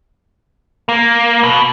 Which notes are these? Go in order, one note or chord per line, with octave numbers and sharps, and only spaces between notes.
A#3
B2